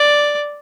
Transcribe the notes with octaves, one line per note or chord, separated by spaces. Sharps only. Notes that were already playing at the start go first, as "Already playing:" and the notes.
Already playing: D5